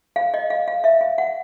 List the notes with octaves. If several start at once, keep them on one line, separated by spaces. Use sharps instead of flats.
F5
D#5
F5
F5
E5
F5
F#5